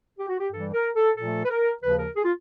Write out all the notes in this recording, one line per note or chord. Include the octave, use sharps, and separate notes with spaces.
G4
F#4
G4
G2 E3 G3 A4
A#4
A4
A#2 F3 A3 A4
B4
A#4
D#2 C#3 F3 B4
A#4
G#4
F4